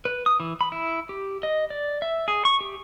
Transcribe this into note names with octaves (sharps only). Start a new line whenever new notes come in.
B4
D#6
E3
B5
E4
G4
D#5
D5
E5
G#4
C#6
G4